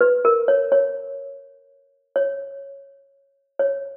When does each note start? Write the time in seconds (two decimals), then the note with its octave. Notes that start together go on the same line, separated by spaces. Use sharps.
0.01 B4
0.25 A#4
0.48 C#5
0.72 C#5
2.16 C#5
3.59 C#5